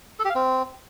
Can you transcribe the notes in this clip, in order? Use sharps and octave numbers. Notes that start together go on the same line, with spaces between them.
A4
G4
F5
C4